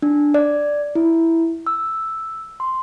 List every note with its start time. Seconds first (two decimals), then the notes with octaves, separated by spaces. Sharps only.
0.02 D4
0.34 D5
0.95 E4
1.67 E6
2.60 C6